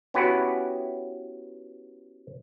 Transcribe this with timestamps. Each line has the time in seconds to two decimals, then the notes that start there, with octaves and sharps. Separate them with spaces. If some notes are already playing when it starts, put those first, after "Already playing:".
0.14 B3 C#4 E4 F#4 G4 B4